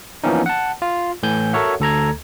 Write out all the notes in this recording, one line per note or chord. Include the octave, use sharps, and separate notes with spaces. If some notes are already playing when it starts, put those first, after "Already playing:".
E3 F3 A#3 B3 C#4 D#4
F#5 A5
F4
A2 E3 G#5 G6
F#4 A4 A#4 C#5 E5 F#5
D2 A4 A#5 G#6